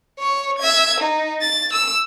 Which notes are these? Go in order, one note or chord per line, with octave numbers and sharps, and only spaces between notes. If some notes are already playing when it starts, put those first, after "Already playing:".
C#5 C#6
E5 G#6
D#4
A6
E6